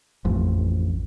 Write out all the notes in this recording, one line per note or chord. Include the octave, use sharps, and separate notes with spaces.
A1 F2